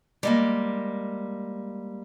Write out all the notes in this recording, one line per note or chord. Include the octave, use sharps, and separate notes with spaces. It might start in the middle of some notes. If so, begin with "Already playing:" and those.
G3 G#3 A#3